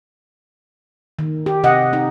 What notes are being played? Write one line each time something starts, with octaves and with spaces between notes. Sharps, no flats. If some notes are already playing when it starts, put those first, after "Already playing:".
D#3
G4
C3 D#5 F#5
D#4